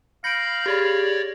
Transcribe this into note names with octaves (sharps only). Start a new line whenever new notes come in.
F5 B5 G6 A#6 C#7 D7
G4 G#4 C#5 D5 B5